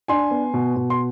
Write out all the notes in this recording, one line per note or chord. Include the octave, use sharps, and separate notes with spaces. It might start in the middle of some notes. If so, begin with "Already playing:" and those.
D4 G#5 C6
B3
B2
B2
C6